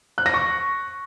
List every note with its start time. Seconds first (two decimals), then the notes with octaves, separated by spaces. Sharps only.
0.18 F#6
0.26 A#6
0.34 C#6